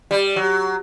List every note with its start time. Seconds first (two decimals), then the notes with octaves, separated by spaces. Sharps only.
0.11 G3
0.36 F#3